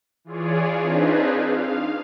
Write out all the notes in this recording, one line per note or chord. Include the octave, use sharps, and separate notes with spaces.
E3 F4 G#4 C#5 D5
C4 D4 D#4 F4 G#4 B4
F5